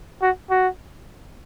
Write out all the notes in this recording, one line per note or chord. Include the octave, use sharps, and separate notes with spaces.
F#4
F#4